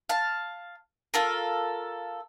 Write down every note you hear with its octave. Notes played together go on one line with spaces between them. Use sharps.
F5 A5
F4 A4 A#4